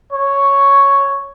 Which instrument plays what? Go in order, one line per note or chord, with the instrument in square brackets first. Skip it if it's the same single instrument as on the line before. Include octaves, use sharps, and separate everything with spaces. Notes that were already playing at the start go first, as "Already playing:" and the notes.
[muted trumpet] C#5